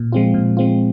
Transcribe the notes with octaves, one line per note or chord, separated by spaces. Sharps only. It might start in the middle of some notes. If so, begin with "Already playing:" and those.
Already playing: A#2
F3 G#3 C4 F4
A#2
F3 G#3 C4 F4